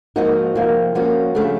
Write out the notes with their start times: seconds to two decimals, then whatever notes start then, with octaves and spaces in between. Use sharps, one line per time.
0.16 G#2 F3 A#3 D#4 F#4
0.55 C3 F3 A#3
0.95 F3 A#3 C#4 F#4
1.35 C#3 F3 A3 D4